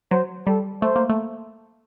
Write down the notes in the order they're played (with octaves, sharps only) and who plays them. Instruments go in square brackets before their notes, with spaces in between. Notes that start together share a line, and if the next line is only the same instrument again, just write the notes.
[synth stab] F#3 [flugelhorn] C5
[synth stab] G3 [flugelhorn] A4
[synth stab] A3 [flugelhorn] C5
[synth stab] A#3
A3